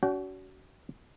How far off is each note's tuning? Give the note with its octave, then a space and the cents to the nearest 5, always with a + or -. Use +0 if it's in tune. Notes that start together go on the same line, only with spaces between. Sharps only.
C#4 +45 F#4 +25 G5 -15